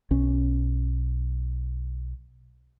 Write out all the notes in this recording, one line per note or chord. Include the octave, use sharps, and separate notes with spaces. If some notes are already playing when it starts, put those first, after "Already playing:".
B1 C#4